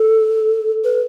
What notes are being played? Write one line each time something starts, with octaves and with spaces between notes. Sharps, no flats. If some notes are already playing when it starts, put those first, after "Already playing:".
Already playing: A4
B4